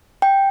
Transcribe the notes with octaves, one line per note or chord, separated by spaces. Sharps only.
G5